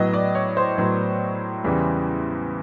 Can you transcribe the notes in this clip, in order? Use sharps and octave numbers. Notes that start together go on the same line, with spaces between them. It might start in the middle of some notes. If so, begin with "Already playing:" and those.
Already playing: A2 F#3 B3 D#5
D5
C#5
C5
A2 F#3 B3
E2 C#3 E3 G3 B3